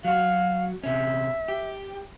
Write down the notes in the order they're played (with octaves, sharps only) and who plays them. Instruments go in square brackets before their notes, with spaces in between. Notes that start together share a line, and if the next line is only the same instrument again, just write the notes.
[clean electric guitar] F#3 F#4 [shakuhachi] F5
[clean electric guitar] C3 C#4 [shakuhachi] E5
[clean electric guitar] G4